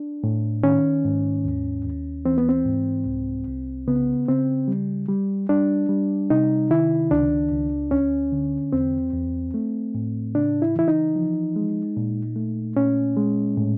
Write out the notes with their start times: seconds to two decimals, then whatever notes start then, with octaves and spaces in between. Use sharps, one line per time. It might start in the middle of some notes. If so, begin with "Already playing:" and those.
Already playing: D4
0.24 A2
0.63 D#3 C#4
1.05 G#2
1.45 D#2
1.85 D#2
2.25 E3 C4
2.38 B3
2.49 C4
2.66 G#2
3.06 C2
3.47 C2
3.88 C#3 B3
4.29 C#3 C4
4.68 G3
5.09 G3
5.49 G3 D4
5.89 G3
6.30 C3 D#4
6.70 D#3 E4
7.11 C#2 D4
7.52 C#2
7.91 D2 C#4
8.32 D3
8.73 E2 C4
9.13 E2
9.54 A3
9.95 A2
10.35 C#3 D4
10.62 E4
10.75 E3 E4
10.88 D#4
11.16 F3
11.56 G#3
11.97 A#2
12.36 A3
12.76 A#2 C#4
13.17 G#3
13.57 A2